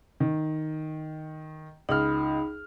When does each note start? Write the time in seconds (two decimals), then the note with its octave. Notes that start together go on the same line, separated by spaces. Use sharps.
0.20 D#3
1.89 C#2 D#4 B5 F6